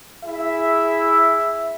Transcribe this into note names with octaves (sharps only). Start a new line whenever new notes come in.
E4 G#4 E5